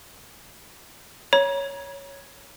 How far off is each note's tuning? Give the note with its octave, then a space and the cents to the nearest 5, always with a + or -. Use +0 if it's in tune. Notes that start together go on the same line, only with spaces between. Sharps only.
C#5 +0 A#5 +40